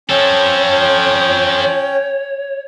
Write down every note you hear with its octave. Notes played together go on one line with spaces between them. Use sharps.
F3 C#4 A4 C#5 G5